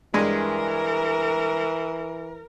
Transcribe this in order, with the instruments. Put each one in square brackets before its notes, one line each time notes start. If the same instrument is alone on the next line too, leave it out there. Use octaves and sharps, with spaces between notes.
[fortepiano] G2 G#3 G#5 [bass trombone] E3 [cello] A#4